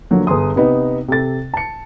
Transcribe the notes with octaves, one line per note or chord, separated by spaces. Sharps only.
D3 F3 F#3 A#3
G1 G#4 C6 D#6
C3 B3 D#4
C3 A4 A6
A5 C#7